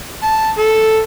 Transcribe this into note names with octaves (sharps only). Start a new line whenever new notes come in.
A5
A4